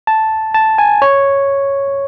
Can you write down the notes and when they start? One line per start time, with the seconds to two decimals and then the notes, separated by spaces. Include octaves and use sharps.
0.07 A5
0.54 A5
0.78 G#5
1.02 C#5